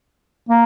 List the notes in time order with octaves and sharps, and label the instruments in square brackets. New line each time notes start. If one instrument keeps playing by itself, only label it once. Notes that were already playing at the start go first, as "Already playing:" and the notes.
[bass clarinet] A#3